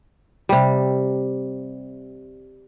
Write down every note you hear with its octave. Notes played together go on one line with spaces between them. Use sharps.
C3 G3